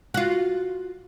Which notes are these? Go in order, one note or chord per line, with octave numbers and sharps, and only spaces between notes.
F4 F#4